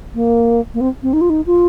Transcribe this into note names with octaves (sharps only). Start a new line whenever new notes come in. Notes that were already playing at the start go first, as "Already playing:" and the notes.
A#3
A#3
C4
C4
D#4
F4
D#4
F4